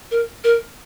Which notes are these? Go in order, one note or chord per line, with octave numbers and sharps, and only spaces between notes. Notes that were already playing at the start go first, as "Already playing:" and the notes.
A#4
A#4